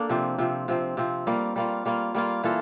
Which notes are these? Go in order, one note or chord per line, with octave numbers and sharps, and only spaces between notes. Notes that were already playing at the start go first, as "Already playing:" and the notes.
Already playing: A#3 D4 A4
C3 F3 C4
C3 F3 C4
C3 F3 C4
C3 F3 C4
G3 A#3 F4
G3 A#3 F4
G3 A#3 F4
G3 A#3 F4
E3 A#3 F4 A4